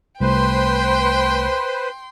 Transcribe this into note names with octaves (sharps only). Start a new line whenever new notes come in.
C2 A3 B4 C5 G5 C6